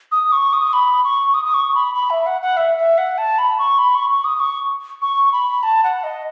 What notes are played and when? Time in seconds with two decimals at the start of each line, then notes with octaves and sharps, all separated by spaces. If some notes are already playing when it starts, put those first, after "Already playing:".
0.12 D#6
0.32 C#6
0.53 D#6
0.73 B5
1.04 C#6
1.34 D#6
1.45 D#6
1.54 C#6
1.75 B5
1.95 B5
2.10 E5
2.26 F#5
2.42 F#5
2.57 E5
2.77 E5
2.98 F#5
3.18 A5
3.38 B5
3.59 C#6
3.78 B5
3.95 C#6
4.10 C#6
4.25 D#6
4.40 C#6
5.02 C#6
5.33 B5
5.63 A5
5.84 F#5
6.04 D#5